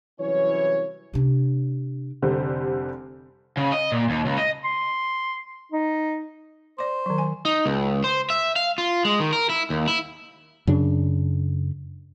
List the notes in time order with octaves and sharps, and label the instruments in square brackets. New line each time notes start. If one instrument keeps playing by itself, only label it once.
[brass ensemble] C2 E3 F#3 C#4 C#5
[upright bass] C3 D4
[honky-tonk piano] F1 D3 G3 C5
[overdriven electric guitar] C#3
D#5
A#2
D#2
C#2
D#5
[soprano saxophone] C6
D#4
[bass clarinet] C5 [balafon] D5 D6
[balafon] D#3 F#3
G#5
[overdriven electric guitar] D#4
C#2
C5
E5
F5
F4
G#3
D#3
A#4
E4
D#2
E4
[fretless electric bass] F#2 C#3 D4